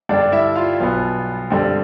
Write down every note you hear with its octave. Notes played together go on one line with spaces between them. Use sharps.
G2 D3 G3 D4 D5
E4 E5
F4 F5
B1 B2 B3
G2 D3 G3 C4